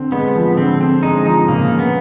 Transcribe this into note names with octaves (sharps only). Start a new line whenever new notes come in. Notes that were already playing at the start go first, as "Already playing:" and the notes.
Already playing: D3 C4
G#3 B3
F3
D3 C4
C4
G#3 D#4
F3 D#4
C#3 A#3
C#3
B3